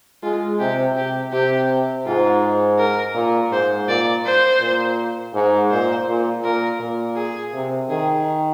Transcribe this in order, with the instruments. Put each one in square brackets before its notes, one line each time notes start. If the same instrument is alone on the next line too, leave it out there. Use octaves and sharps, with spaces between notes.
[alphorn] G#3 [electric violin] F4
[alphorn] C3 [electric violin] G4
[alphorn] C3 [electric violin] G4
[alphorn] C3 [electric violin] G4
[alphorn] G#2 [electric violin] F4
[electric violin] A#4
[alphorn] A#2
[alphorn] G#2 [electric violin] C5
[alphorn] A#2 [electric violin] D5
[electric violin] C5
[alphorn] A#2
G#2
[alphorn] A#2 [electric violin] C5
[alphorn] A#2
[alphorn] A#2 [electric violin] A#4
[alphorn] A#2
[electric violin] G#4
[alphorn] C3
[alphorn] D#3 [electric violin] G#4